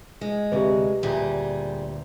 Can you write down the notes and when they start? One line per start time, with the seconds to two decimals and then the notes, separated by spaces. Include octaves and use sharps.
0.21 G#3
0.52 D2 C3 G4 B4
1.03 D2 A#2 G3 G#4